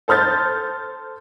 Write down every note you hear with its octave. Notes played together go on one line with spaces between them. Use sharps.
A4 C5 F6 G6 A6